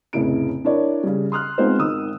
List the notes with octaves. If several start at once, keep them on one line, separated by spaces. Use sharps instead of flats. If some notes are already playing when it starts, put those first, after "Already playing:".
F1 A2 C#3 E4 D7
D4 E4 A#4 C#5 D5
C#3 G3
C6 D#6 F6 F#6
G#3 B3 C4 D#4 F4 C5
G#1 D#3 D#6 E6